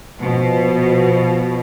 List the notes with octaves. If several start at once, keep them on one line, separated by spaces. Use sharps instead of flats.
B2 F3